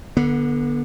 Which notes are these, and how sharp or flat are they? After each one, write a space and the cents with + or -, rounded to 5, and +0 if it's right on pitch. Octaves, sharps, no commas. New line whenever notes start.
D3 +0 B3 -30